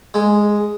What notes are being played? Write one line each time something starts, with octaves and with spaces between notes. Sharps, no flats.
G#3